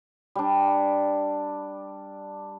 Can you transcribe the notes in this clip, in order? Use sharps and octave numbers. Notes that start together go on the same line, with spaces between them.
G3 D4